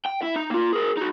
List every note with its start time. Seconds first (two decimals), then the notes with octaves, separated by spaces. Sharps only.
0.05 G5
0.22 E4
0.36 D#4
0.50 A#3 F4
0.73 G#4 A#4
0.97 D#4 F#4